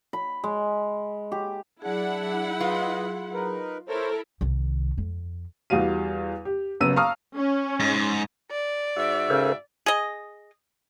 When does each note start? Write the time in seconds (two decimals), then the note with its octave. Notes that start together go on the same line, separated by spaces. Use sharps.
0.13 B5
0.44 G#3
1.32 G4
1.82 F#3 D4 E4 G#4 F#5
2.60 F4 B4 D#5
3.33 D#4 A#4 B4
3.88 E4 A4 A#4 C5 C#5
4.41 C2 D#3
4.98 F2
5.70 E2 G3 F#4 F5 D#7
6.45 G4
6.80 F#1 F#2 B3 E6 D#7
6.96 F5 A5 A#5 C#6 D#6 F6
7.36 C#4
7.80 G#2
8.51 D5
8.96 G#2 F#4 E5
9.30 C#3 A4 A#4 C5
9.86 G#4 D#5